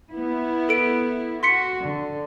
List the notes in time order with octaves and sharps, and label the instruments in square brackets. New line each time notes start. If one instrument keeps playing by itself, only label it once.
[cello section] B3 E4
[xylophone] A4 D7
[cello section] F#4 [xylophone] C6 B6 C#7
[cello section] D3